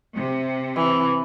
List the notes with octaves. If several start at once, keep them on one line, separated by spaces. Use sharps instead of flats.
C3
E3